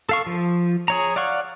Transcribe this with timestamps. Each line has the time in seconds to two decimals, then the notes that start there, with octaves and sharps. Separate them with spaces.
0.09 A4 F5 C#6
0.26 F3
0.88 G#4 C#5 A#5
1.16 D5 F5 F#5 C#6